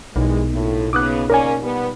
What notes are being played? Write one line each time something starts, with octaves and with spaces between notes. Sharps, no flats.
B1 B2 E3 G3 G#3 D#4 A#4
A2 A#3 F4
C#3 B3 D#4 D6 D#6 F#6
C#3 A#3 C#4 A#4 D5 G#5
G3 B3